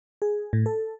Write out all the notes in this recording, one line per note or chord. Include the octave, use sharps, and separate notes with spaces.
G#4
A2
A4